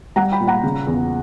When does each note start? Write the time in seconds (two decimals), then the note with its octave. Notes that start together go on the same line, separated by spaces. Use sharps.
0.16 G3 F#5 A#5
0.32 G5 B5
0.41 A#2
0.47 F#5 A#5
0.64 C#3
0.87 E2